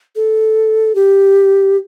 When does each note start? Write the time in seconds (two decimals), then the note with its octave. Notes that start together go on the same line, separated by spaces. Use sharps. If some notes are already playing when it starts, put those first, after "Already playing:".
0.16 A4
0.95 G4